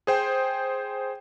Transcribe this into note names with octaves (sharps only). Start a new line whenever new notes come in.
G#4 C5 G5